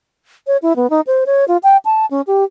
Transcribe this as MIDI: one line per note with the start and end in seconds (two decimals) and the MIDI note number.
0.47 0.57 73
0.62 0.76 64
0.76 0.89 59
0.90 1.01 63
1.07 1.24 72
1.26 1.45 73
1.48 1.57 65
1.63 1.77 79
1.85 2.06 81
2.11 2.21 61
2.27 2.44 67